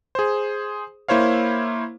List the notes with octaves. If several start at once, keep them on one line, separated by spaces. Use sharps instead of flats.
G#4 C5
A#3 E4 C5 C#5 F5